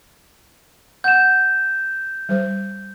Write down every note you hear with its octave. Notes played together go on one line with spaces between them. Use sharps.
F#5 G6 E7
G3 C5